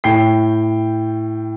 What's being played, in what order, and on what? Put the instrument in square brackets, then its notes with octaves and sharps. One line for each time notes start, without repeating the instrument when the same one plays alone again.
[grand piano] A2 G5 C7